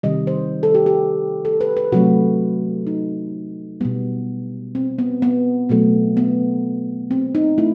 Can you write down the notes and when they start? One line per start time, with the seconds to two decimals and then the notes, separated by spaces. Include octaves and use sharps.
0.03 C3 D#3 G3 D#5
0.27 C5
0.63 A4
0.75 G4
0.86 G4
1.45 A4
1.61 B4
1.77 B4
1.92 C3 F#3 A3 F#4
2.87 D#4
3.81 B2 G3 B3
4.75 C4
4.99 B3
5.22 B3
5.69 B2 F#3 A3
6.17 B3
7.11 C4
7.35 D#4
7.58 A3 E4